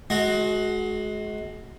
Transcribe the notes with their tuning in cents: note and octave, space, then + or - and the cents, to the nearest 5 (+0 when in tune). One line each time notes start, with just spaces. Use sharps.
G#3 +30 F#4 +0